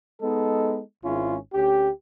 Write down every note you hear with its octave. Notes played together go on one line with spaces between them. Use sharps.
G#3 B3 D#4 A4
G#1 G#2 C#4 E4 F4
D2 C#4 G4